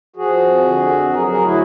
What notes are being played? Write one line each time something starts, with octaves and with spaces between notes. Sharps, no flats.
F3 F#4 G#4
F2
D3
F2
F#3 G#4 A#4
G#4 A#4
D2
E4 F#4